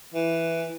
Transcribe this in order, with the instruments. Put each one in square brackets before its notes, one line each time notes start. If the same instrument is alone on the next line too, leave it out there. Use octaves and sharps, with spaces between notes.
[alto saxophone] E3